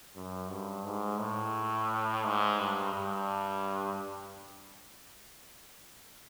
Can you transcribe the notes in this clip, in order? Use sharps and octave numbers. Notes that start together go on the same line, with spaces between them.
F#2
G2
G#2
A2
G#2
G2
G2